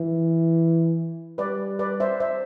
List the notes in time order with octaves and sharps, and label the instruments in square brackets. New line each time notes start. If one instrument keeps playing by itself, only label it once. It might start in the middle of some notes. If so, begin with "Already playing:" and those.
Already playing: [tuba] E3
[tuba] G3 [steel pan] B4 D5
[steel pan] B4 D5
C5 E5
C5 E5